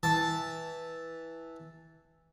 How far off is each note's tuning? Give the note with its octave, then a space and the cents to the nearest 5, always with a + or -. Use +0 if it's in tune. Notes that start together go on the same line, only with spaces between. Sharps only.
E3 -10 A5 +0